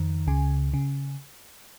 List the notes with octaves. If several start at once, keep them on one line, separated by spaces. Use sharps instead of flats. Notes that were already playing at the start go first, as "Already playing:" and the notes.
Already playing: F2 D#3
C#2 C#3 G#5
C#3